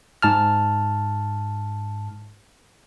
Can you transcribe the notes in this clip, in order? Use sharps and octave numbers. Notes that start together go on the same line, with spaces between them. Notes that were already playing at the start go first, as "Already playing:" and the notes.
G#2 A5 F6